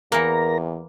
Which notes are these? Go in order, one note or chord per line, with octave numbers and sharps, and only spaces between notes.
E2 E3 A#3 A#4 A#5